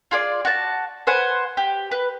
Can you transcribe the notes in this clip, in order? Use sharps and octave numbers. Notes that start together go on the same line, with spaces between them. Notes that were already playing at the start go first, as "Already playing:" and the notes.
F4 G#4 D5
F#4 A5
B4 C5 F#5 G#5
G4
B4